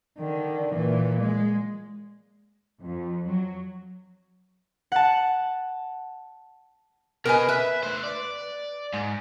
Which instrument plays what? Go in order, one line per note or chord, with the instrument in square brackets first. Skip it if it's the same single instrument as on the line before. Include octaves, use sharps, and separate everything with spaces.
[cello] D3 D#3
A#2 E3
G#3
[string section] F2
F#3
[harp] F#5 A5
[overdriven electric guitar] B2 D#5 [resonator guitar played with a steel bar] A#4 B4 G#5
[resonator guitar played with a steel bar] B4 [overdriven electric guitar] E5
[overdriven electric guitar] A3 C5
D5
G#2